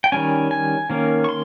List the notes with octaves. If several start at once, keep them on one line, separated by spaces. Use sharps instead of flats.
G5
D#3 G3 C#4 G#5
G#5
D#3 A#3 C#4
C#6
C6